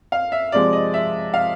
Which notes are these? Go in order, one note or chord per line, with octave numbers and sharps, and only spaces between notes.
F5
E5
C3 F3 G#3 D5
D#5
E5
F5